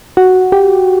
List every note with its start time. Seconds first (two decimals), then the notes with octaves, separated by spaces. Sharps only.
0.17 F#4
0.52 G4